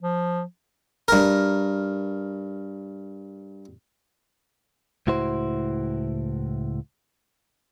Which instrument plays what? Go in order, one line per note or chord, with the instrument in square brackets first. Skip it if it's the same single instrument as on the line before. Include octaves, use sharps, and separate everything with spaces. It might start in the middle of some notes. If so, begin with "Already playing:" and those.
[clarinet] F3
[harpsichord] G2 A#4
[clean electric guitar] C#2 A2 E4 F#4 C5